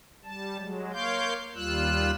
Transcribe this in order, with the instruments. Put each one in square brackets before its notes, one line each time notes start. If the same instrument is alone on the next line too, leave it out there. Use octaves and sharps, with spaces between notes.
[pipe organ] G3 A5
F#3 G#3
A#3 C#5 F5 C6 D6 G6
D#2 G3 F4 E6 F#6